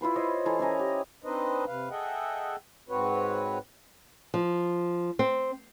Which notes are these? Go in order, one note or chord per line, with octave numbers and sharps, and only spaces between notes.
E4 F4 B4 C6
C5 C#5 D#5
E3 E4 A4 A#5
C#4 E4 D#5 A#5
G4
C4 D4 D#4 B4 C5 D#5
C3 B4 F5
G#4 A4 D#5 E5 F#5 G5
G#2 C4 F#4 B4 C#5
F3
C4